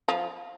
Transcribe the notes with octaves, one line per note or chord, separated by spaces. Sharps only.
F3